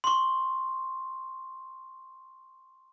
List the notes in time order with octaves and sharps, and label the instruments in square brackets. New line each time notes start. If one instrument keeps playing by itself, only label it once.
[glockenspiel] C6 C#6